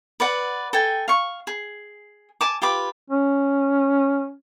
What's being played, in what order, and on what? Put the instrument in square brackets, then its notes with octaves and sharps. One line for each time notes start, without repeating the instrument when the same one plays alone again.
[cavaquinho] B4 D5 F#5
A4 G5 G#5
F5 C#6
G#4
G#5 A5 D6
F4 G4 B4 D6
[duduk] C#4